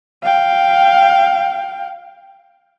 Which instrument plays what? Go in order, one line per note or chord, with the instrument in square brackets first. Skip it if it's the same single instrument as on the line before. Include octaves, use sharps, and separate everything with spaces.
[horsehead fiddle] F5 G5